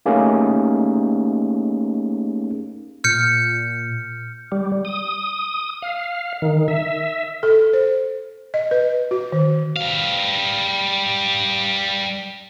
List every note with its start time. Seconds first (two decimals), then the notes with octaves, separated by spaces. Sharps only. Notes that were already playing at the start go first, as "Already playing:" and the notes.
0.06 A3 A#3 C#4 D#4 G4 G#4
3.04 A#2 F6 G6 C#7
4.52 G3
4.85 D#6
5.82 F5
6.42 D#3
6.68 E5
7.43 A4
7.73 C5
8.54 D#5
8.71 B4
9.11 F#4
9.32 D#3
9.76 G3 F5